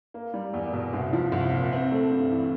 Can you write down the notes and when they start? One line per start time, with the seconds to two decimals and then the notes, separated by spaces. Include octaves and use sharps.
0.14 A#3
0.34 G3
0.54 E2
0.73 B2
0.93 C2
1.13 F3
1.32 C2
1.52 A#2
1.72 C4
1.91 A3
2.11 G2
2.31 E3